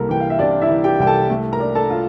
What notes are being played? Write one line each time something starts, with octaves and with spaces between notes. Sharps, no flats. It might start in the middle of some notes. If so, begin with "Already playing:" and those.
Already playing: C2 A#3 A4 A#4
E3 G5
F5
E5
C3 D4 D5
E4 E5
E3
G4 G5
C2 G5
A4 A5
A3
A#4 A#5
D4
A4 A5
F4